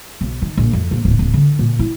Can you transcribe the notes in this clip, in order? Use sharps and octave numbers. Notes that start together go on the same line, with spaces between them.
B1
D#3
A#1
F2
A#1
D1
D1
D3
A#2
E4